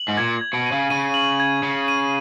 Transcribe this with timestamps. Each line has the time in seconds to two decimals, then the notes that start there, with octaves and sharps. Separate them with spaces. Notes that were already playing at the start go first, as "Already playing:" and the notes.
Already playing: F#7
0.08 G#2
0.17 A#2 G#6
0.41 G#6
0.53 B2
0.66 D#7
0.72 C#3
0.90 C#3 D#7
1.14 F#7
1.40 G#6
1.63 C#3 G#6
1.88 D#7